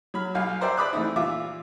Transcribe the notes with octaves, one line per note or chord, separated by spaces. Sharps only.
F#3 B5 F6
B1 F5 G#5
A#4 C5 D5 E5 G5
B4 D5 B5 D6 D#6 F#6
E3 A3 C4 D#4 E4
A#2 E3 F4 E5 D6